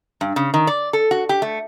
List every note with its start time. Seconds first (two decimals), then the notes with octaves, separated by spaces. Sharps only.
0.21 G2
0.36 C#3
0.54 D#3
0.67 D5
0.93 A4
1.11 F#4
1.29 G4
1.42 A3